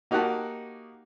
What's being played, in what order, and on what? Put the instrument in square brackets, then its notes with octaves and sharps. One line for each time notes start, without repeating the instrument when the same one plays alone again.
[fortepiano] A#3 D#4 F#4 G4 F#5 A5